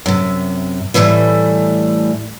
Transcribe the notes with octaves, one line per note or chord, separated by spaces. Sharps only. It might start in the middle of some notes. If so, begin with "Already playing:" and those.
F#2 C3
A2 E3 F3 G3 A3